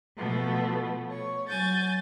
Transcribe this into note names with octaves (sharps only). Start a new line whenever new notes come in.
B2 F3 A3 B3 A4
C#5
F#3 G#5 G6 A6